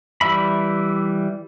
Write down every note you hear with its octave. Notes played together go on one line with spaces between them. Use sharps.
E3 G3 E5 B5